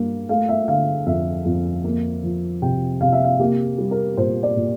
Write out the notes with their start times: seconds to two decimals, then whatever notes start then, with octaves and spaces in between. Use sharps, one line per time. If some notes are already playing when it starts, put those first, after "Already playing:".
Already playing: G2 A#3
0.29 A3 F5
0.49 E5
0.68 D3 F5
1.06 F2 E5
1.45 F2
1.84 A#3
2.23 F3
2.62 C3 G5
3.01 C3 F5
3.12 E5
3.24 F5
3.40 A#3 G4
3.78 G3
3.91 A#4
4.17 A#2 C5
4.43 D5
4.56 A#2